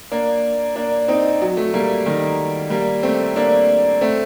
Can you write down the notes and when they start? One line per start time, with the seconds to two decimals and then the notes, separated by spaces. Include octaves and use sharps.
0.11 A#3 D4
0.76 A#3 D4
1.08 C4 D#4
1.42 F#3
1.57 F#3 A3
1.74 G3 A#3
2.06 D#3 G3
2.70 G3 A#3
3.03 A3 C4
3.36 A#3 D4
4.01 A3 C4